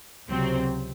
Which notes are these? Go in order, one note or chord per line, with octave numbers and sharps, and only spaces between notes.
C#2 C3 F#3 C4